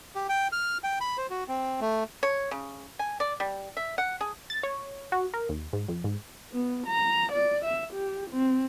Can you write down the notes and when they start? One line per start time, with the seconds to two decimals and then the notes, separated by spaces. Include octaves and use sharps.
0.15 G4
0.29 G5
0.52 F6
0.84 G5
1.01 B5
1.17 C5
1.30 F#4
1.48 C4
1.81 A3
2.23 C#5
2.51 C#3
2.99 G#5
3.20 D5
3.40 G3
3.77 E5
3.98 F#5
4.21 G#4
4.50 A6
4.63 C#5
5.12 F#4
5.34 A#4
5.49 D#2
5.73 G#2
5.88 F2
6.04 G#2
6.52 B3
6.87 A#5
7.32 D5
7.65 E5
7.93 G4
8.31 C4